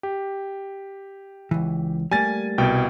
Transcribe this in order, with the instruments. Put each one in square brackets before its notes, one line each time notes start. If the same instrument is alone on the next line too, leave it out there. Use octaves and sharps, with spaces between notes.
[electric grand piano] G4
[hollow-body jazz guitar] C#2 E3
[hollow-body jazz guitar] G3 A3 A#3 [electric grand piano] G#5 A6
[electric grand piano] C2 B2 G5